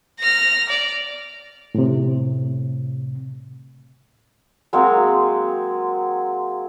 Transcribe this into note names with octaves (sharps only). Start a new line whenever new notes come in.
F6 A#6
D5
A2 C3
F#3 G#3 A#3 C4